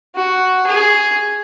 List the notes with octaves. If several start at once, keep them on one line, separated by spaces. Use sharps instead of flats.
F#4
G#4